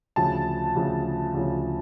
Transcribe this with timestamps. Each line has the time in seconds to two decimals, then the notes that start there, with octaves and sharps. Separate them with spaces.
0.16 D2 C#3 F3 A5
0.75 D2 C#3 F3
1.34 D2 C#3 F3